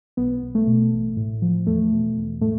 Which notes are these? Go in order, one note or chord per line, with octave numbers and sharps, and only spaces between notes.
B1 B3
B1
A3
B2
A1
A2
F3
E2 A3
B2
E2
A2 A3